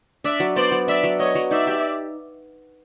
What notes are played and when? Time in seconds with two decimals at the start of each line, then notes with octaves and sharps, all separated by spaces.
0.24 D4 D5 E5
0.40 F#3
0.56 B3 C5 D5
0.72 F#3
0.88 D4 D5 E5
1.04 F#3
1.20 B3 C#5 D#5
1.35 F#3
1.51 D#4 D5 E5
1.67 G4